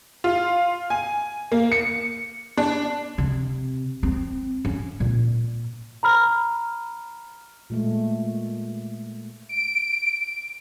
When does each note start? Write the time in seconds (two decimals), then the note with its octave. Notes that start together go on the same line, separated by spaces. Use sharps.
0.24 F4
0.90 G#5
1.52 A#3
1.72 C#7
2.58 D4
3.18 C3
4.03 C4
4.65 C#4
5.00 A#2
6.03 A#5 B5 F6
7.70 A#2 G#3 A3
9.49 D7